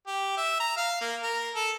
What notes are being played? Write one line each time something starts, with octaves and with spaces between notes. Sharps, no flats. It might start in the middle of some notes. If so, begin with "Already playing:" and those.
G4
E5
A#5
F5
A#3
A#4
A4